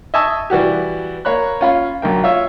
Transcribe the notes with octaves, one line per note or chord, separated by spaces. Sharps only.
D#5 E5 G#5 A5 C#6 E6
E3 G3 F#4 G4
A#3 C#5 B5 F#6
C#4 F4 B5
B1 D3 A#3 G5
F4 C#5 E5